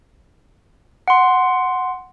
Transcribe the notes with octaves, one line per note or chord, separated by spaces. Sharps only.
F#5 C6